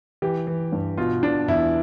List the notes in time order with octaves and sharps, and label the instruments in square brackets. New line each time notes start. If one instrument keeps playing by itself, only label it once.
[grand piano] E3 G4
E3
G2
B2 F4
B2 D4
E2 E4